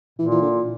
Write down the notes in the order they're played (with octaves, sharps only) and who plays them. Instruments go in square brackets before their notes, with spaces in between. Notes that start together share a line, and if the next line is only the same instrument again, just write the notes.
[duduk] A#2 [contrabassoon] E3
[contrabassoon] E3
D3